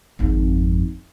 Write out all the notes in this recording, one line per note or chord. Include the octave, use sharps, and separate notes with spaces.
G#1 F2